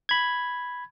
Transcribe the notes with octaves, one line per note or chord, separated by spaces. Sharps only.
B5 G#6